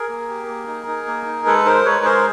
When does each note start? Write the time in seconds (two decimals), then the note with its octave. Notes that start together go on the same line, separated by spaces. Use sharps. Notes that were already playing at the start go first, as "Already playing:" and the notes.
Already playing: G#4 A#4
0.09 A#3
0.29 G4
0.48 A#3
0.68 D#4
0.87 D#4
1.07 A#3
1.26 D#4
1.46 G#3 A4 B4
1.66 D#4 A#4 C5
1.85 G#3 B4 C#5
2.05 G#4 A#4 C5